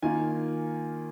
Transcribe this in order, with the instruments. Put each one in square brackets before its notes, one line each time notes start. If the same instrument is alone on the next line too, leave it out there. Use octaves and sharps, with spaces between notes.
[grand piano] D#3 A#3 F4 G#5